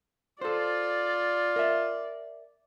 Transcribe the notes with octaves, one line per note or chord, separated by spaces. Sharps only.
F4 A4 C5 D5
A#4 E5